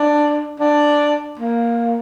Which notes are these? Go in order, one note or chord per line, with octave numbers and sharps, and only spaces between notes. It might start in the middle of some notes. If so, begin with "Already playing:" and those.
Already playing: D4
D4
A#3